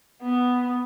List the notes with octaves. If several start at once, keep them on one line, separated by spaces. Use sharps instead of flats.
B3